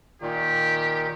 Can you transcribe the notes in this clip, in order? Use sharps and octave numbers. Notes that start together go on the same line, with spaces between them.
A#2 D#3 G4